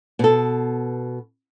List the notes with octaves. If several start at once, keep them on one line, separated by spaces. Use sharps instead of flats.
B2 A4